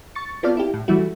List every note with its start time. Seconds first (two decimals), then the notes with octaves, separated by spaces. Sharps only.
0.15 C#6 A6 C#7
0.43 B3 C4 F4 A4 D5 F5
0.57 E4 G4
0.74 A2
0.88 E3 G3 A3 E4 F#4